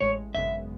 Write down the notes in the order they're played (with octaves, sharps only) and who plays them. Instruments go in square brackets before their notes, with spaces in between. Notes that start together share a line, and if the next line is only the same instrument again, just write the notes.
[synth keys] A1 A2 G#3 [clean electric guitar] C#5
[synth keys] G#1 F#2 C#3 G#3 B3 [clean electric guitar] E5